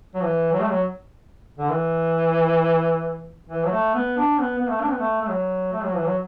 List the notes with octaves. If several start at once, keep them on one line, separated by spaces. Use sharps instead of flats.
F#3
E3
F#3
A3
F#3
D3
E3
E3
F#3
A3
B3
D4
B3
B3
A3
D4
B3
A3
A3
F#3
A3
F#3
E3
F#3